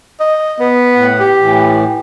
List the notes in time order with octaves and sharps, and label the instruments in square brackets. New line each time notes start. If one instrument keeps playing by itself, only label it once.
[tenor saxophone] D#5
B3
[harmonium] A2 F#5
[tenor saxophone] G4
[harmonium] A2 E3